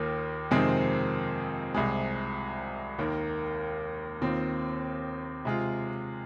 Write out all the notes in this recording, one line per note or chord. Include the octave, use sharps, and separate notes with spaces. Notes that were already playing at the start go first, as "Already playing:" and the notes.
Already playing: D#2 D#3 A#3 F4
F2 C3 D#3 G#3 C4
C2 C3 G#3
D#2 D#3 A#3
D#2 D#3 C4 F4
C3 G#3 F4